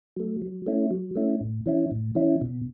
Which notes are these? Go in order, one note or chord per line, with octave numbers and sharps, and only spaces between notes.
F#3 A3
F#3
A3 C#4 E4
F#3
A3 C#4 E4
A2
E3 C#4 E4
A2
E3 C#4 E4
B2